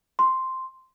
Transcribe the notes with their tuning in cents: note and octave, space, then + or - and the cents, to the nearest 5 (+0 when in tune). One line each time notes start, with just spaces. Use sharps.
C6 -5